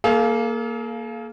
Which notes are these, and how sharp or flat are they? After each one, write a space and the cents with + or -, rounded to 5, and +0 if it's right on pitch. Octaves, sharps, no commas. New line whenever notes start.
A#3 +0 G#4 +45 F5 -10